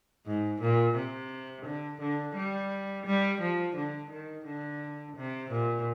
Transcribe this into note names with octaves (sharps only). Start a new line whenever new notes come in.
G#2
A#2
C3
D3
D3
G3
G3
F3
D3
D#3
D3
C3
A#2